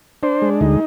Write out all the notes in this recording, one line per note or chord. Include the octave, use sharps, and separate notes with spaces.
D4 C5
G#3
D2 D#4